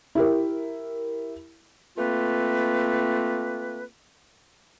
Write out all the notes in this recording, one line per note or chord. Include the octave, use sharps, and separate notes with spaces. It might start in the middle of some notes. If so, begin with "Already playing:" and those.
E4 G4 A#4
A3 A#3 C4 F4 B4